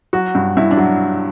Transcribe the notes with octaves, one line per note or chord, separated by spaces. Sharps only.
F#3 F#4
G2
G2 E4
D4
F#3